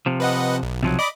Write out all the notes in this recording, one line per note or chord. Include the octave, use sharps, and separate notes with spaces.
C3 F3
B4 D#5 F#5
B1
C3 F3 F#3
D5 D#5 B5 D6